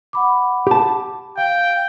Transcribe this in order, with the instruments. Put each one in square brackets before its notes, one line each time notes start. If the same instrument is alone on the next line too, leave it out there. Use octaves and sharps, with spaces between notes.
[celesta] F#5 B5 D6
[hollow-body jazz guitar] G4 A5
[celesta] F5 [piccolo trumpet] G5